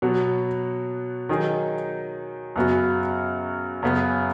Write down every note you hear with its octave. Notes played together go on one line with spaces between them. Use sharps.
B2 F#3 B3
D#3 F#3 D#4 G#4
F#2 C#3 B3 F#4
F#2 C#3 B3